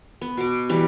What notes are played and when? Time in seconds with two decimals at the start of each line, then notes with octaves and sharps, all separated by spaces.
0.21 B3
0.37 B2 D6
0.69 E3 G3